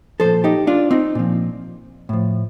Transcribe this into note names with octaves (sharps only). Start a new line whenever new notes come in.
A#2 F3 A4 C5
D#4 G4
D4 F4
C4 D#4
A#2 F3
A2 F3